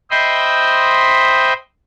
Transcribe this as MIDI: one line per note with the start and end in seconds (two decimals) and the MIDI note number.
0.11 1.53 72
0.11 1.53 75
0.11 1.53 76
0.11 1.53 79
0.11 1.53 83
0.11 1.53 84